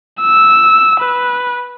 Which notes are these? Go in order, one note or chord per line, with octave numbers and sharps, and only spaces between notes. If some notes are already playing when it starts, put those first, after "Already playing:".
E6
B4